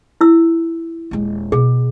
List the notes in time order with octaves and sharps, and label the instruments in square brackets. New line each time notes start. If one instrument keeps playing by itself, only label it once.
[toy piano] E4 E6
[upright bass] D#1 G#3
[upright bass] B2 [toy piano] G#4